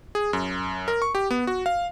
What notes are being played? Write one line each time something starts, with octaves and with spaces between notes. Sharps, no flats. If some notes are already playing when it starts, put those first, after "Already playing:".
G#4
F#2
A#4
C#6
G4
B3
F#4
F5